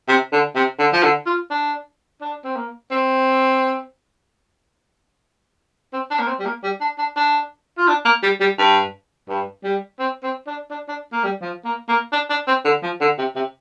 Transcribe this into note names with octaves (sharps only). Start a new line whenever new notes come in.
C3
D3
C3
D3
F3
D3
F4
D4
D4
C4
A#3
C4
C4
D4
A#3
C4
G3
A#3
G3
D4
D4
D4
F4
D4
A#3
G3
G3
G2
G2
G3
C4
C4
D4
D4
D4
A#3
G3
F3
A#3
A#3
D4
D4
C4
D3
F3
D3
C3
C3